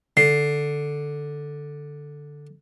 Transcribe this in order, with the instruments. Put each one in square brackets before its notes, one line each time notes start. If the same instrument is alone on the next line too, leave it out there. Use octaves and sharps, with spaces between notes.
[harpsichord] D3 [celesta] C7